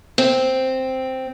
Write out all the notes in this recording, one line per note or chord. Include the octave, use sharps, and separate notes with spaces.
C4